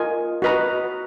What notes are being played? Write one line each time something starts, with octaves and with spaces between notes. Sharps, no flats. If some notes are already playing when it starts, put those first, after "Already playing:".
Already playing: F4 A#4 D#5 G#5
F#4 B4 D#5 A#5